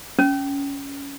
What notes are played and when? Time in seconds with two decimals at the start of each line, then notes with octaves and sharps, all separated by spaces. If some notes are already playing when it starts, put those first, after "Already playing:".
0.19 C#4